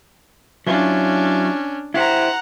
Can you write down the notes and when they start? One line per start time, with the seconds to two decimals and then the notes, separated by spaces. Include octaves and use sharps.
0.67 F#3 C#4 D4 E4 F4
1.94 E4 G4 C5 F#5 A#5